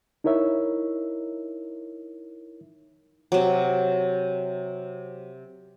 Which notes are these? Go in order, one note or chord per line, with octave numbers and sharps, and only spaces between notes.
D#4 E4 A#4 C#5 E5
C3 F#3